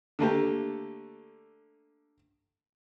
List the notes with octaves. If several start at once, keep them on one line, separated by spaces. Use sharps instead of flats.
D3 A3 A#3 G4